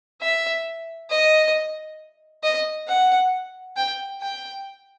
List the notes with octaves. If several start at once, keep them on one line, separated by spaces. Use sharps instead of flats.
E5
D#5
D#5
F#5
G5
G5